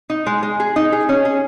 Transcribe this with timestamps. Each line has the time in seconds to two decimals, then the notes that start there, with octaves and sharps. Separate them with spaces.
0.10 D#4
0.26 G#3
0.43 G#3
0.60 G#4
0.76 D#4
0.92 G#4
1.09 C#4
1.25 G#4